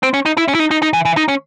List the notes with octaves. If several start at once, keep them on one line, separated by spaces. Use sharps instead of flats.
C4
C#4
D#4
E4
C#4
E4
D#4
D#4
D#4
E3
E3
D#4
C#4